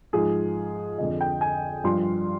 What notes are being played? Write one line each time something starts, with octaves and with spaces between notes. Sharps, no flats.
G#2 F3 G#4
F2 D3 F3 D#5
G5
G#5
G2 F3 C6